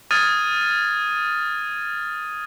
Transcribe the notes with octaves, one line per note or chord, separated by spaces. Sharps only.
D#6 F6 G#6 A6 D#7